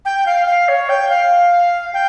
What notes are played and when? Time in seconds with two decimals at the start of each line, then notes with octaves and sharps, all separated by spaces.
0.05 G5
0.26 F5
0.47 F5
0.68 C#5
0.89 G5
1.10 F5
1.93 G5